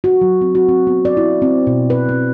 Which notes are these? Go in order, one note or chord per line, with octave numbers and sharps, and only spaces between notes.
F#4
F#3
C4
F#4
C4
B3
D5
E4
C4
B2
B4
C4